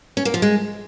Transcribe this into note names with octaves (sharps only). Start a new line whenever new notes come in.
C#4
A#3
F3
G#3